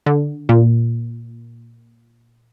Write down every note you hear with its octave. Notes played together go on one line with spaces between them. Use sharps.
D3
A#2